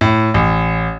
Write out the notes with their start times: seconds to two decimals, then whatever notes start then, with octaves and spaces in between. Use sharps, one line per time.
0.01 A2
0.34 A1